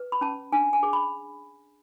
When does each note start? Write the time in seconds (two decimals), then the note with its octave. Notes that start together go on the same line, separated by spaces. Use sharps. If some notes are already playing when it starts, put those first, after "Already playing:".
Already playing: B4
0.12 B5
0.21 C#4 A5
0.52 D4 G#5
0.73 G#5
0.83 G#4
0.93 B5